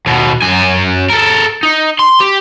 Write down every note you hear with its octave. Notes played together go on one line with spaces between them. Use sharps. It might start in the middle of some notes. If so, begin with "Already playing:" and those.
D#2 B2
F#2 G#5
A4 A#4
D#4
C6
G4